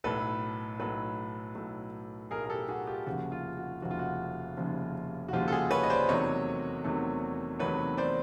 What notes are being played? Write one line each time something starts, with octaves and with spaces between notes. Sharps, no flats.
B1 A2 F#3 A4 B4
B1 A2 F#3 A4 B4
B1 A2 F#3
B1 A2 F#3 G#4 A#4
A#4
G4 A4
F#4 G#4
F4 G4
F1 D#2 C#3 F3 G#3 F#4
F4
F#4
F1 D#2 C#3 F3 G#3 F#4
F4
F#4
F1 D#2 C#3 F3 G#3
F#4
F1 D#2 C#3 F3 G#3 F4 G4
A4
F#4 G#4
B4 C#5
D#5
C5 D5
E2 C3 D#3 F#3 A3 C#5 D#5
E2 C3 D#3 F#3 A3
E2 C3 D#3 F#3 A3 B4 C#5
C5 D5